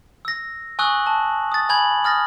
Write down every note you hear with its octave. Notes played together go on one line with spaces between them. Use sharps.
E6 A#6
G#5 C#6 D#6 E6 F#6 F#7
G#5 A5
D#6 A6
G#5 B5 G6 G#6 F#7
D#6 F6 A6 A#6